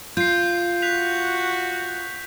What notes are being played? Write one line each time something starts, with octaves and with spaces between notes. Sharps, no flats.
F4 G6 C7
F#4 F#6 B6 F7